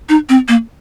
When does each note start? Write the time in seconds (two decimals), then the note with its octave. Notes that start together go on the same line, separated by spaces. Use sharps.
0.09 D#4
0.29 C4
0.48 A#3